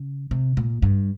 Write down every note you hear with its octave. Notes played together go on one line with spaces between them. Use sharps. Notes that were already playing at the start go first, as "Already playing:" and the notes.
Already playing: C#3
C3
A#2
G2